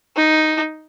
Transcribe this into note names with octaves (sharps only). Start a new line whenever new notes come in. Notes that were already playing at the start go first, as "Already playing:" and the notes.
D#4